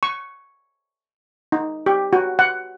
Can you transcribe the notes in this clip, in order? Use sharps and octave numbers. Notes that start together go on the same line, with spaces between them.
C#6
D#4
G4
F#4
F#5